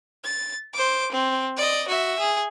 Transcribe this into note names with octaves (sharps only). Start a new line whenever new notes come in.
A6
C5 D6
C4
D5 D#5
F#4 E5
G#4